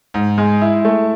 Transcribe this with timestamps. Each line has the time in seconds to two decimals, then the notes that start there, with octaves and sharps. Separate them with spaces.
0.14 G#2
0.38 G#3
0.62 E4
0.85 A3